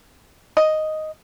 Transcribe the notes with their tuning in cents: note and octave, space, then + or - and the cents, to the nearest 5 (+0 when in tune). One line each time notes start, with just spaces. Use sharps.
D#5 +0